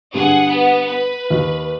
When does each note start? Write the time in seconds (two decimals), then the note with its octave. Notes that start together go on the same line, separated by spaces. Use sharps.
0.14 G2 D3 G#4 F#5
0.48 B3
0.85 B4
1.30 D#2